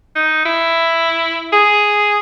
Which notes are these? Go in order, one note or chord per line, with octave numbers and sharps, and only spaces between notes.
D#4
E4
G#4